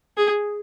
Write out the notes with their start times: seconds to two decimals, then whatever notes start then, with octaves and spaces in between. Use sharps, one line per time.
0.17 G#4